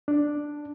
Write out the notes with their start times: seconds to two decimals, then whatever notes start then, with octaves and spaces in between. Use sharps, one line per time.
0.08 D4